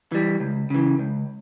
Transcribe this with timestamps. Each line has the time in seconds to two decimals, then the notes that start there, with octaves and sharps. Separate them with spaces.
0.12 E3 G3
0.40 C#2
0.70 C#3 E3
0.99 C#2